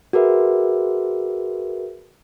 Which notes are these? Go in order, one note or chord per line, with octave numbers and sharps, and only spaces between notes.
F#4 G#4 A#4 B4 E5